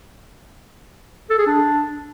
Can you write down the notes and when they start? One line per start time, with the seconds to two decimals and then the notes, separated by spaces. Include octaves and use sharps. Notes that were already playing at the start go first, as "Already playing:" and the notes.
1.30 A4
1.39 G#4
1.47 D4